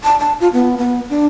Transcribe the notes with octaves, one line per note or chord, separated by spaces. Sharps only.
A5
A5
F4
B3
B3
D4